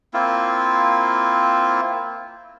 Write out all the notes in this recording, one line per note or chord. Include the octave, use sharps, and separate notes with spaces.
A#3 C4 E4 F4